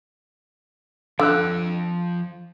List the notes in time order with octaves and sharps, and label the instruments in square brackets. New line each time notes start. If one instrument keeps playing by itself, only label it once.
[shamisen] D3 [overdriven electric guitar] F3 G5 [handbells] F5 E6 F#6